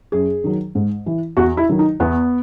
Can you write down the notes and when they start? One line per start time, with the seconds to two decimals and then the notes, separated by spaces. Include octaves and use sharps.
0.12 F#2 G#4
0.44 D#3 F#3
0.75 G#2
1.06 E3
1.37 E2 F#4
1.57 E4
1.69 D#3 F#3
1.79 D#4
2.00 E2 B3